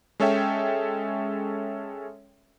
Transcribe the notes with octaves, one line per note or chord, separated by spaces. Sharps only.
G#3 C#4 A4 C#5 E5 G5